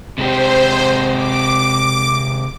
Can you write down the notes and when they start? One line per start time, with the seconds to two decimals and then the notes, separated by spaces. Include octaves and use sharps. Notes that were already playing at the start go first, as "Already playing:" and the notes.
0.18 C3 G#3 G4 C5
1.14 D6